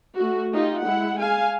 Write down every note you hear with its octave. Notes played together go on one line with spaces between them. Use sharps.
A3 F#4
D#4 F4 G4 D#5
G#3 E4 F#5
G#4 F5 G#5